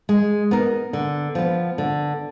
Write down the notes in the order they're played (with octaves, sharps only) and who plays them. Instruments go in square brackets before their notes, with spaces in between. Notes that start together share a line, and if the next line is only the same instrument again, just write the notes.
[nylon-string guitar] G#3
B3 D#4 A#4
D3
F3 B3
D3